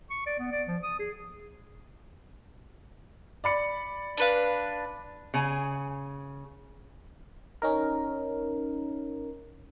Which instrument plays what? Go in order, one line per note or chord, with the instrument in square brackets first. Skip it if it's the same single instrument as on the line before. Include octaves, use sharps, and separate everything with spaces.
[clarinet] C#6
D5
B3
D5
F3
D#6
G#4
[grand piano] D5 B5 C#7
[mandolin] D4 B4 F5
[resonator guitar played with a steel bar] C#3 G#5
[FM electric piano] C#4 D#4 A#4